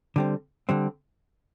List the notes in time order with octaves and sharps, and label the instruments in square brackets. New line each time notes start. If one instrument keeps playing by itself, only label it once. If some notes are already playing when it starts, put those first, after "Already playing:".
[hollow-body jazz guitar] D3 G3 C4
D3 G3 C4